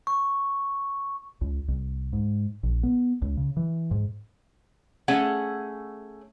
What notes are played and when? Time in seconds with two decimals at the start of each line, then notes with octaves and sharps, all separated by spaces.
0.07 C#6
1.41 C#2
1.68 C2
2.13 G#2
2.63 A#1
2.83 B3
3.22 C#2
3.37 C#3
3.57 E3
3.91 G#2
5.08 A3 C#4 G#4 F#5